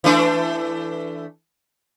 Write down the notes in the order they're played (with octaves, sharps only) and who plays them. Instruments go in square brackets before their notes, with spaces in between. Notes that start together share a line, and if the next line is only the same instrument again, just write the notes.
[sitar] E3 A3 D4